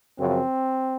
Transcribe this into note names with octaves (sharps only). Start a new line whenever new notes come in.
F#2 C#3 F3 C4